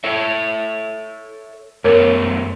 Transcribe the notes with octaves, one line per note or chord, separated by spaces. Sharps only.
A4 C#5 E5
F#2 A3 B3 A#4 C#5